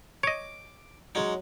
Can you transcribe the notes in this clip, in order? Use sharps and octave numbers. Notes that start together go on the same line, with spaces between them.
C#5 D#5 D6
F#3 G#3 C#4 D#4